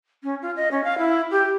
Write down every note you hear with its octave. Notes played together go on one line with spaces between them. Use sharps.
C#4
F4
D#5
C#4
F5
E4
G4